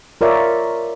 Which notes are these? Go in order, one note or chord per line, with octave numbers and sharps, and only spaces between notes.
F4 A#4 C#5 D5 E5